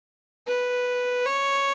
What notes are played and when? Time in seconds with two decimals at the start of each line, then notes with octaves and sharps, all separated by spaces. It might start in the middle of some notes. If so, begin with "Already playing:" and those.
0.47 B4
1.26 C#5